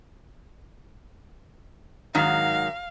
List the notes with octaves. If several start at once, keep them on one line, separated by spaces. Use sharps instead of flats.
G#2 D#3 F#3 F5